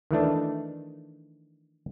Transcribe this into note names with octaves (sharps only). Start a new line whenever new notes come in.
D#3 E3 A3 D4